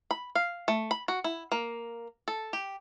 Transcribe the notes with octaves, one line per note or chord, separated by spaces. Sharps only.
B5
F5
A3
B5
F#4
E4
A#3
A4
G4